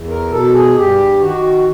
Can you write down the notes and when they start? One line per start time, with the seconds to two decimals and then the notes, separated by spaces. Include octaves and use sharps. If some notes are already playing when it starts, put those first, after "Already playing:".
Already playing: E2
0.08 A#4
0.30 B2 A4
0.53 G#4
0.75 G2 G4
1.20 D#3 F#4